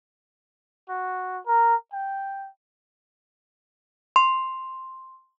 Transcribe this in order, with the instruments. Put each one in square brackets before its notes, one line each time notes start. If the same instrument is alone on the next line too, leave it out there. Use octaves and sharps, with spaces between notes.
[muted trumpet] F#4
A#4
G5
[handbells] C6